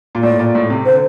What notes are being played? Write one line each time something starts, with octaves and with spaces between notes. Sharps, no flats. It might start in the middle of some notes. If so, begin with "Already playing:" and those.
A#2
A2 D5
A#2
A2
C3
D3 C5